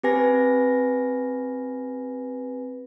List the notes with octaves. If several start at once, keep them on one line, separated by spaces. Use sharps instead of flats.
C4 G4 B4 G#5 A#6